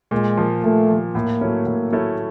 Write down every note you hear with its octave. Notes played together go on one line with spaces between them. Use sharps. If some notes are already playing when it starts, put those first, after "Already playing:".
A#2 G#3
F3 A#3
A#2 A3
F3 A#3
A2 A#3
F#3 A3 C#4 E4
A2
F#3 A3 C#4 E4